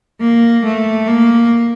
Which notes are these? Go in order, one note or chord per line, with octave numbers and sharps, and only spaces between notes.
A#3
A3
A#3